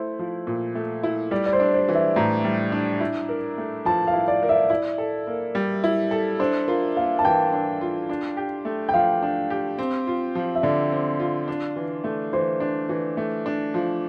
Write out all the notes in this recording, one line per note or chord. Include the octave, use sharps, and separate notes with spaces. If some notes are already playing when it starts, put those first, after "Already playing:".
Already playing: A3 E4 C5
F3
A#2
A3
E4
G3 D5
D5
C5
D4
C5
E3
E5
A2 A#5
G3
D4
E4
A#4
A3
F3 A5
F5
E4
D5
A#4
E5
E4 D5
A4
A#3
G3
E4
A4
D4 C5
F4 A#4
A#3 F5
A5
E3 G5
D4
F4
D4
G4
A3
G5
F3 F5
D4
G4
C4
F4
F3
E5
D3 D5
C4
F4
D4
E3
A3
E3 C5
D4
E3
A3
D4
F3